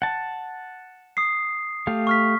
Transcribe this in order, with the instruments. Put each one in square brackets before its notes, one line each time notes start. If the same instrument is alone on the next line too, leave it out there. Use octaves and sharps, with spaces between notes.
[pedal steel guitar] F#5 A5
[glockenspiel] D#6 C7
[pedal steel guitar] A3 G4 F5
[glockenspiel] C#6 F6 B6